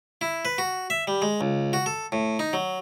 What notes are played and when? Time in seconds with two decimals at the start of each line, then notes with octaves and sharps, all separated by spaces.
0.21 E4
0.45 B4
0.58 F#4
0.90 E5
1.07 G3
1.22 G#3
1.41 C#2
1.73 F#4
1.86 A4
2.12 A2
2.39 D#4
2.53 F#3